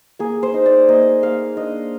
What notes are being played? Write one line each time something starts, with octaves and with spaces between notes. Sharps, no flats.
A#3 G#4
C5
D#4
D5
A#3 D#5
A#3 F5
D4 D#5